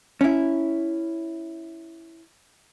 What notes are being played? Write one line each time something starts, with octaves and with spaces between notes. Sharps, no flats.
C#4 E4